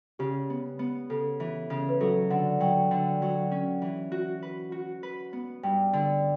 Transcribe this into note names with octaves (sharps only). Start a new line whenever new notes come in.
C#3 G4
B3
B3
C#3 A4
E3
C#3
B4
F#3 A4
D3 F#5
F#3 G5
D3
F#3
C#4
E3
F#4
B4
F#4
B4
B3
G2 G5
D3